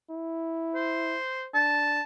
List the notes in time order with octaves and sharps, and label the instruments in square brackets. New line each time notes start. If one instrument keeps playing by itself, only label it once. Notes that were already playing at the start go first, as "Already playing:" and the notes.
[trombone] E4
[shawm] C5
[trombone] D4 [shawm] A5